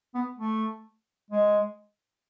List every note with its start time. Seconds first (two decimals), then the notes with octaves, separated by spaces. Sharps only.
0.15 B3
0.38 A3
1.31 G#3